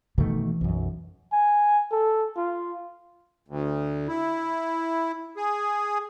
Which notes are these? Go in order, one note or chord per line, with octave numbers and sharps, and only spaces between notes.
B2 D#3 E3 A3
B1 F#2
G#5
A4
F4
D2
E4
G#4